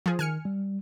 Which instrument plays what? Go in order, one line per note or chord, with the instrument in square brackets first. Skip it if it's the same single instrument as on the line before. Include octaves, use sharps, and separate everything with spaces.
[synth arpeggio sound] F3 G#4
[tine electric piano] D#3 [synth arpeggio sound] G#5 F6 C#7
[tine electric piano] G3